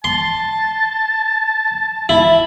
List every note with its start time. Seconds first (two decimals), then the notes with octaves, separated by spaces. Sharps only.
0.04 A5 C6
2.09 E4